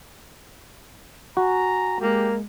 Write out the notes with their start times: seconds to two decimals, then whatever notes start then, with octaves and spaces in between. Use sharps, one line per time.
1.37 F#4 G#5 A#5
2.00 G#3 A#3 G4